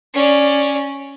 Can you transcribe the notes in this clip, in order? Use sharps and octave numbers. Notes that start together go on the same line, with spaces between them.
C#4 D5